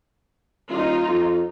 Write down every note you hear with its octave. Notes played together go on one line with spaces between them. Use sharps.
D#1 D#4 F4
F2